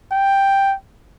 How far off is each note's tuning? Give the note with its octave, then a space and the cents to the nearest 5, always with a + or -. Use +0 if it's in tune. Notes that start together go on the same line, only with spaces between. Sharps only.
G5 +5